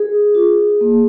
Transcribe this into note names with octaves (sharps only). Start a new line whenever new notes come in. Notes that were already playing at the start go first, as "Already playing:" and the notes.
Already playing: G#4
F4
A#3